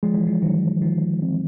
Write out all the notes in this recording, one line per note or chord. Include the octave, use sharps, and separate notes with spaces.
F3 G#3
E3
F3
D#3 F#3
D#3 F3
C4